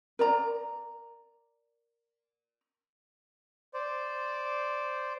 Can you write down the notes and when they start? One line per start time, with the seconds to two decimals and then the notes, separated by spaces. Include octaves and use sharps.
0.19 A#4 D5 A#5
3.74 C5 D5